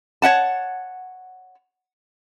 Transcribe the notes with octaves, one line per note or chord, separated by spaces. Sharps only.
C#5 E5 F#5 A5